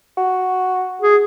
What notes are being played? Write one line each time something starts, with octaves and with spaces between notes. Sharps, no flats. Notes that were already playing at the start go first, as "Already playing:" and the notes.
F#4
G#4